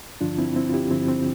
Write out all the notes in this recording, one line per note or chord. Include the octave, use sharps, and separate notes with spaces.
G2 D3 F3 D4 F4
C4 E4
C4 E4
F4
E4 G4
G2 D3 F3 C4 E4
C4